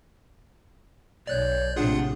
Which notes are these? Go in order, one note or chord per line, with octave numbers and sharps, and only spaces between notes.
B1 C#5 D5 F#6 G6
A#1 A2 C3 D4 F4 G#4 F#5